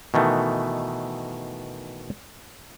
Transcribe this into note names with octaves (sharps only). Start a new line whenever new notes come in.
B2 D#3 E3 A3